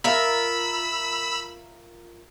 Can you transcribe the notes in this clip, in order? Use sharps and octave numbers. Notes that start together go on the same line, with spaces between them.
F4 A#4 E5 B5 E6